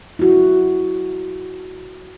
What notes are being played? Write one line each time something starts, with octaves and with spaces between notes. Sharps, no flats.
E4 F#4